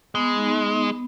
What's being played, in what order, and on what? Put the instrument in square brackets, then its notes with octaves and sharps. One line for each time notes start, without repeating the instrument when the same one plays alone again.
[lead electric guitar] G#3 [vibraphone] B3
[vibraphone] D#4
B3
B3